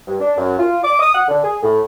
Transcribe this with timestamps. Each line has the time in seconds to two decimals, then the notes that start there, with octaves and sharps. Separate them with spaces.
0.07 G2
0.20 D4
0.37 F#2
0.59 F4
0.84 D6
1.00 D#6
1.15 F#5
1.29 D3
1.44 G#4
1.63 A2